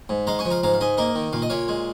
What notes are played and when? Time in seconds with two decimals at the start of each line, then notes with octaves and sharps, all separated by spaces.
0.09 G#2
0.27 G#3 F5 A#5
0.39 G#5 C#6
0.45 F3
0.51 F5 A#5
0.63 G#2 F5 A#5
0.74 F5
0.80 G#2 D#5 G#5
0.98 A#3 A#4 D#5
1.15 D#3
1.33 A#2 F5
1.42 D#5
1.50 A#2 C#5 F5
1.68 G#3